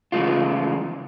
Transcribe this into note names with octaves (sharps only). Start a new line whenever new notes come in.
C#3 E3 F3 G#3 A3 F4